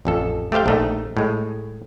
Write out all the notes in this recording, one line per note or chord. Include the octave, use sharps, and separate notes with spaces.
A1 F2 A4
A3 G4 C5 F5 G5
A#1 A3 D#4
A2 G#3